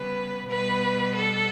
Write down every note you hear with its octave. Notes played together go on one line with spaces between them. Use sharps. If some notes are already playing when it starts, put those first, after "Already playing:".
Already playing: C#3 G3 B3 B4
B2 G3 B3 B4
A4